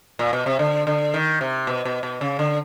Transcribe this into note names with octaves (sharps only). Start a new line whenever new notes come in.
A#2
B2
C3
D3
D3
D#3
C3
B2
B2
B2
C#3
D3